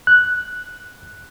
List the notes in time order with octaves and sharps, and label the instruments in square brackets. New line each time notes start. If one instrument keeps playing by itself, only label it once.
[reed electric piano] F#6